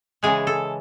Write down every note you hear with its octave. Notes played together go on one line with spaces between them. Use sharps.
C#3 E3 G#3 G#4
A4